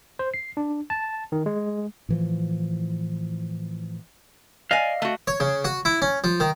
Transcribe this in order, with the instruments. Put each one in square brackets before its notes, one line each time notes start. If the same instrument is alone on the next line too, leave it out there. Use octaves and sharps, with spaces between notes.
[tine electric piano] C5
C7
D4
A5
D#3
G#3
[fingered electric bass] A2 E3 F3
[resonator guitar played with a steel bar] D5 G#5 [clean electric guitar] D#5 F5
[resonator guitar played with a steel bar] A3 F#4
[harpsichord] C#5
C#3
F#4
E4
C#4
F3
D#3